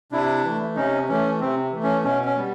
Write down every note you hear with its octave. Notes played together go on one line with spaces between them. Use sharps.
C3 D4 E4
E3 A3
C3 C#4 D#4
E3 A3 C#4
C3 C4
E3 A3
C#4
B2 C#4
C#4
G3 B3